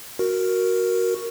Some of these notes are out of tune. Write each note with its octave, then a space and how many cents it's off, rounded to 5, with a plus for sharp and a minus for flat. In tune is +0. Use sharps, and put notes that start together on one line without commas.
F#4 +0 A#4 +0